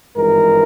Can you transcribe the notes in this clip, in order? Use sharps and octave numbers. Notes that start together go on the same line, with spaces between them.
G#1 G2 E3 G#3 A#4